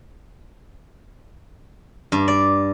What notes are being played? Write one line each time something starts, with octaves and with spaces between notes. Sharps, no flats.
G2
D5